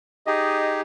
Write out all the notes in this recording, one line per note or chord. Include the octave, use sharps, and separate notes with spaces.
D#4 G4 G#4 D#5